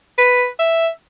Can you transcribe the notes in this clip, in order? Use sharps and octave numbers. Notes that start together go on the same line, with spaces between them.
B4
E5